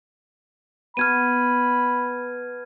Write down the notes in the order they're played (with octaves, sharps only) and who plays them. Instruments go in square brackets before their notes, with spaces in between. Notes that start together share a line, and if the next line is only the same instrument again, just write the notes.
[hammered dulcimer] B3 A5 C#6 [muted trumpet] B5 [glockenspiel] F6 G#6 D#7